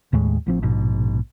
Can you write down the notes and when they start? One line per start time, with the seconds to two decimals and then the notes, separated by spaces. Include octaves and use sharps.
0.13 D#2 A2 G#3
0.46 A1 F3 C4
0.63 A#1 G#2 B2